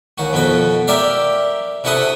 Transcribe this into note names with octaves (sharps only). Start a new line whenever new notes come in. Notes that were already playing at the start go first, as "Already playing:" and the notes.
D#2 F#4
F2 B2 F#4 B5
G4 A#4 D5 E5 F5
C3 E4 F#4 A4 B4 D#6